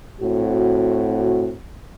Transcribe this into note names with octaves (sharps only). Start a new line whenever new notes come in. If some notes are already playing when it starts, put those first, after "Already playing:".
A2 C4 F#4